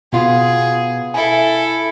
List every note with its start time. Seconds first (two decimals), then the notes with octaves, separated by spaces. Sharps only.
0.13 B2 B3 F4 G#4
1.14 E4 A4 E5 G#5